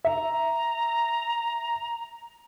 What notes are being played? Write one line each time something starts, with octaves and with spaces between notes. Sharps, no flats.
E5 A#5